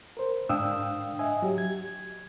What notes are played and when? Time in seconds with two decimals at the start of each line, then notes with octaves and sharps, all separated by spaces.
0.17 A#4 C5
0.49 G#2 D4 F5 G5 D#6 E6
1.19 D#5 E5 G#5
1.42 F#3 G4
1.58 G#6